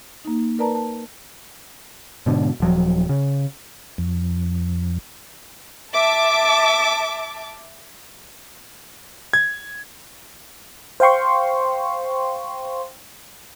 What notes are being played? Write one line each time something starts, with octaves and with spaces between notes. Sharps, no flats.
A#3 D#4
A#4 B4 D5 A5 A#5
A5
G#2 B2 D3
D#1 F3 F#3
C#3
F2
E5 A5 D6
G#6
C5 F5 G5 C6 C#6